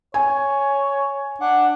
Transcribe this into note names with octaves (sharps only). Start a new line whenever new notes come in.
C#5 G#5
D4 F#5